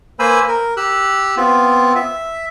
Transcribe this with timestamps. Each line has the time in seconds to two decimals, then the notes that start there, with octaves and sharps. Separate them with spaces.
0.19 A#3 B4 C5 G#5 B5 E6
0.48 A#4
0.77 G4 E6 F#6
1.37 B3 C4 F4
1.95 E5